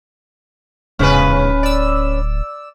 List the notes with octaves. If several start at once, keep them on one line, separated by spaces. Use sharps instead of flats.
D1 E2 G#2 C#3 C#4 B4
D5 E6